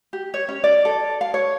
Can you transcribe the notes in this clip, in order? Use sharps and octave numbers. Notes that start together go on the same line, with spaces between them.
G4
C#5
C#4
D5
A4
F5
C#5